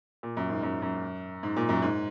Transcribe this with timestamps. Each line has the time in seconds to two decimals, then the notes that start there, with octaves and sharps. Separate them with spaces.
0.23 A#2
0.37 F#2
0.50 G#2
0.63 F#2
0.82 F#2
1.43 G#2
1.56 A#2
1.69 F#2
1.82 G#2